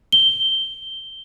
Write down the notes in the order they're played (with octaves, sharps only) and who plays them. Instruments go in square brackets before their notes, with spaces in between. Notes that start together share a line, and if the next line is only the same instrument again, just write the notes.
[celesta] G7